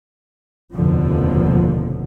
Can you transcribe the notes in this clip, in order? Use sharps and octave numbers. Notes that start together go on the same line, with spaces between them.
F1 D#2 B2 D3 F3